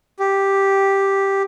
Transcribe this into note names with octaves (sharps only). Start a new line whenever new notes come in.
G4